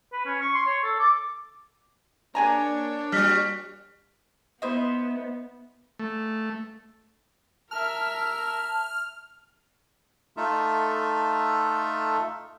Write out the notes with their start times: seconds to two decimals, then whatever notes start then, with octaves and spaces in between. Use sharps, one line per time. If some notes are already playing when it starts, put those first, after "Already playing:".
0.13 B4
0.25 C#4
0.41 C#6
0.54 C6
0.66 C#5
0.84 A4
0.99 D6
2.35 A#3 D4 G#4 C#5 G#5 A#5
3.12 G3 F#4 F6 B6
4.62 B3 D#4 E4 C5
5.99 A3
7.71 A#4 E5 A5 F6
10.37 A3 D#4 F4 A4 E5